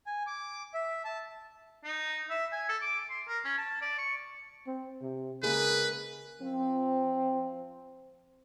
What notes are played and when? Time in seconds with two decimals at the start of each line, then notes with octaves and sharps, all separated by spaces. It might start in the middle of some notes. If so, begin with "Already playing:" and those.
0.07 G#5
0.27 D6
0.74 E5
1.05 A5
1.84 D#4
2.30 E5
2.52 G#5
2.69 A4
2.82 D6
3.10 C6
3.28 A#4
3.45 C#4
3.58 A5
3.82 D5
3.98 C#6
4.67 C4
5.02 C3
5.43 C#3 G#3 A#3 G#4 B4
6.42 F3 C4